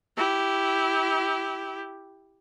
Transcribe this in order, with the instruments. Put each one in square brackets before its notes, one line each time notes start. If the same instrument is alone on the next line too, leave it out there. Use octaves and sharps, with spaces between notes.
[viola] E4 G4